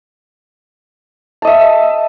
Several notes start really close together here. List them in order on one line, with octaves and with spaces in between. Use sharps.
A5 D#5 E5